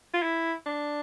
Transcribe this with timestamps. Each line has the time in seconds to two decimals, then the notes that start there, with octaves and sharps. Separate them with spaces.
0.14 F4
0.22 E4
0.66 D4